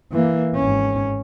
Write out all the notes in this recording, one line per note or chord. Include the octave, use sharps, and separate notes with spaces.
E3 A#3
G#1 C#4